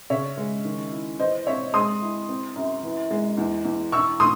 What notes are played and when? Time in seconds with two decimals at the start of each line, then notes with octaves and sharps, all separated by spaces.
0.10 C#3 C#5 E5
0.37 G#3
0.65 D#3
0.92 E4
1.19 E3 C5 D#5
1.47 C4 C#5 E5
1.74 G#3 C6 D#6
2.02 E4
2.29 C4
2.56 F#2
2.83 E3
3.11 G#3
3.37 E2
3.65 E2
3.92 E4 C#6 E6
4.20 A2 C6 D#6